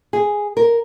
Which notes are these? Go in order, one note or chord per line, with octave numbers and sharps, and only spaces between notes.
G#4
A#4